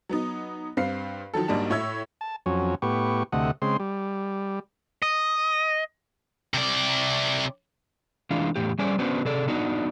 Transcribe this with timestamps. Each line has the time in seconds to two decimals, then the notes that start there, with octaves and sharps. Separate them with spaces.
0.09 F#3 B3 D#4
0.77 G2 C4 F5 C7
1.34 D#3 F3 F#3 A4
1.48 B1 G#2 G3 A#3 D4 A5
1.70 A2 C#5 E5 E6 G#6
2.21 A5
2.46 F2 F#3 C#4
2.82 A2 B3 G4 C#6
3.32 D2 C3 A3 D#5 F#5
3.62 C#3 G#3 C4 C6
3.80 G3
5.02 D#5
6.54 C3 D5
8.31 E3 G#3 D4 F4
8.56 E2 A2 G4
8.79 G3 C#4 G#4 C5 D5 G#5
8.99 B3 C#4 D4 F#4 B4 C5
9.25 C3 G#4 A4 D5
9.47 B3 D4 D#4 F#4